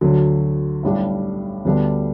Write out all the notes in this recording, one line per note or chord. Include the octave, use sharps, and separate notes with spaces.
D2 D3 F#3
B1 A2 G3 D4 G4
D2 D3 G3 B3 D4